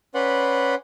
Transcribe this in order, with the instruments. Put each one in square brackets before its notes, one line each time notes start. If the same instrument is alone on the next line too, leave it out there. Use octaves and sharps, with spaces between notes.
[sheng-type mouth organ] C#4 B4 D5 F#5 B5 C6